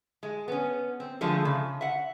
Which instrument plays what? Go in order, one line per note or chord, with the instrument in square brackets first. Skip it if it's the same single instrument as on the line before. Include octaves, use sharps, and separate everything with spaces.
[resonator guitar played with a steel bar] G#3
B3 C#4
C4
D3 F3 G#3 A3
C#3
E5 F#5